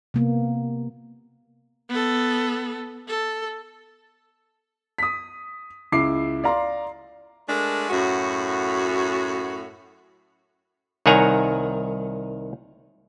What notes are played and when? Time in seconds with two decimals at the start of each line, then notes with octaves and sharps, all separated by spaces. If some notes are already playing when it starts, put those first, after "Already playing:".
0.14 C3 A#3 B3
1.90 B3 A4
3.08 A4
4.98 D#6 B6
5.92 C#2 E4 D6 C7
6.44 D5 F5 A#5 C6
7.47 G#3 A3 D4 A#4
7.90 F#2 A2 F#4
11.06 C2 D#3 C#5 F#5 G#5 A#5